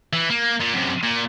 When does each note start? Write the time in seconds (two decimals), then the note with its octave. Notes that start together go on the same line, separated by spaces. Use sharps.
0.13 E3
0.30 A#3
0.60 A#2
0.74 F#2 C3
1.03 A#2